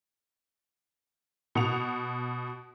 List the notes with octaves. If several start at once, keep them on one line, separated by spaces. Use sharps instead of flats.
B2 F#5 F7